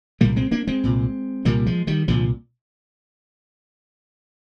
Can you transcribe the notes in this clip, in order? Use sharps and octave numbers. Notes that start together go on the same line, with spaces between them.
C2 A#2 G3 A#3
G#3 C4
A#3 D4
G#3 C4
C2 A#2
C2 A#2 G3 A#3
F3 G#3
D#3 G3
C2 A#2 D3 F3